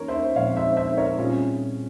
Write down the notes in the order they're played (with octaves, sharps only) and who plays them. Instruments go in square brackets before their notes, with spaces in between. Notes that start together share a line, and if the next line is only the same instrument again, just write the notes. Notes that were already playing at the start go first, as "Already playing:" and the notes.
Already playing: [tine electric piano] E3 A#3 C#4 [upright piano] A#4 C#5
[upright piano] C5 E5
[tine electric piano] A#2 F3 G#3 C4 [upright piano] C#5 F5
[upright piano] C5 E5
C5 E5
A#4 C#5
[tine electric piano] A#2 G3 C4 E4 G#4 [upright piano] C#4 F4